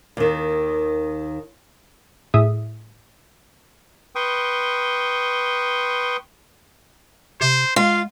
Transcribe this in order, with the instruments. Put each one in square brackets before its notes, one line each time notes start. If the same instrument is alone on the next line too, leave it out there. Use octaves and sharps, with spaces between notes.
[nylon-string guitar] D#2 D#3
[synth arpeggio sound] A2 G#4 E5 D#6
[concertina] B4 G5 C6 C#6 D#6
[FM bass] C3 [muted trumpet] C5
[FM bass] G#3 [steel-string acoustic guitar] F4 [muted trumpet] F5